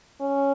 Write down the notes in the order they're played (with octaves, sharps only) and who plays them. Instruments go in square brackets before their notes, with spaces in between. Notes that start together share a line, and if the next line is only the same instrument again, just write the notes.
[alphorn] C#4